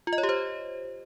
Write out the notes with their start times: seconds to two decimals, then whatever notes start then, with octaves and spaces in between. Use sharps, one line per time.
0.07 F4
0.13 D#5
0.18 C#5
0.23 G4
0.29 C5